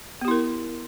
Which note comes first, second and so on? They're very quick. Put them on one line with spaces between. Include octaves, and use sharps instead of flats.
B3 G4 E4 A#4